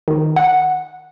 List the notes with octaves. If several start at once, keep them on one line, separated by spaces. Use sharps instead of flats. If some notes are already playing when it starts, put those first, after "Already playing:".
D#3
F#5